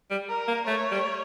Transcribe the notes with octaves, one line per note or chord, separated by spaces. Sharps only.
G3
A#4
A#3
A3 C#5
G3